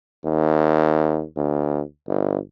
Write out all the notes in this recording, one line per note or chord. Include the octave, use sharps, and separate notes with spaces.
D#2
D2
G1